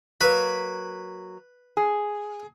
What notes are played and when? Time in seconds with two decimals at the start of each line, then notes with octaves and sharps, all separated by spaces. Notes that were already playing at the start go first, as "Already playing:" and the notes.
0.21 F#3 A#3 B4 B5
1.77 G#4